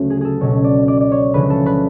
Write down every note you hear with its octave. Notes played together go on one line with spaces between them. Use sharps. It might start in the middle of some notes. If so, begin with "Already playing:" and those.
Already playing: D2 C#3 F#3 A3
G#4
G#4 A4
C#2 B2 F#3 C#4 C#5
D5
D5
D5
C#5
D2 C#3 F3 G#3 C#4 B4
A4
B4